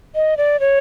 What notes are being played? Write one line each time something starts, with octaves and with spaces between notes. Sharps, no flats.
D#5
D5
C#5